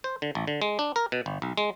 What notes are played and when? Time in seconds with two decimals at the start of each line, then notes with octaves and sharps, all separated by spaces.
0.04 C5
0.22 D3
0.35 A1
0.48 D3
0.62 G#3
0.79 D4
0.96 A#4
1.12 B2
1.26 G1
1.42 B1
1.58 G#3